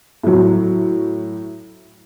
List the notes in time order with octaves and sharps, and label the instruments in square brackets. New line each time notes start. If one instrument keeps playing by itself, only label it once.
[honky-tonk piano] A2 F#3